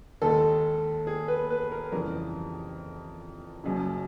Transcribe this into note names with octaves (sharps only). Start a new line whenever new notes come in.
D#2 D#3 G#3 A4
G#4
B4
B4
A#4
F2 C#3 E3 G3 A#4
F#1 F#2 C#3